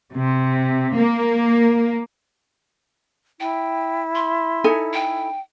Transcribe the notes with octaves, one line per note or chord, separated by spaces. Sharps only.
C3
A#3
E4 G5
C6
D#4 A4 G#5
G5